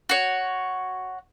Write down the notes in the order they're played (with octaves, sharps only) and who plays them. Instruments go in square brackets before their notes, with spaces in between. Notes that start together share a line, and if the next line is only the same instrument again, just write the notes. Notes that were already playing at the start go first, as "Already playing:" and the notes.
[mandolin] F#4 C#5